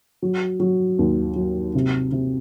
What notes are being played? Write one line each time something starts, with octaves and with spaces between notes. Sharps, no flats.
F#3
F#3
D#2
F#3
C3
C3